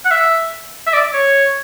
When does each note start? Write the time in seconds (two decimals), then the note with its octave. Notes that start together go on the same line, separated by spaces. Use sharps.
0.05 F#5
0.11 E5
0.87 E5
0.93 D5
1.14 C#5